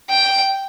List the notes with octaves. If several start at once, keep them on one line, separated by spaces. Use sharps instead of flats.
G5